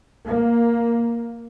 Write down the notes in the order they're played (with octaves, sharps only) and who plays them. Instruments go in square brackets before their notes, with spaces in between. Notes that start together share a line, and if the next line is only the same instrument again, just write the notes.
[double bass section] A#3